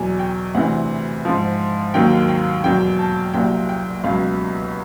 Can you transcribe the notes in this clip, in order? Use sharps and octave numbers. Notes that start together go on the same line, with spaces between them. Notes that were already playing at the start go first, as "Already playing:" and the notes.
Already playing: E2 B2 F#3 G#5
G5
D2 C3 E3 F#5
G#2 F3
D#2 D#3 F#3 G5
G5
E2 B2 F#3 G5
A5
C2 A#2 F#3 G5
G5
C#2 B2 F#3 F5